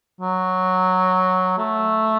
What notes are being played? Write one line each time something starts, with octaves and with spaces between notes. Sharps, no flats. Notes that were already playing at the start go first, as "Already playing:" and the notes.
F#3
A3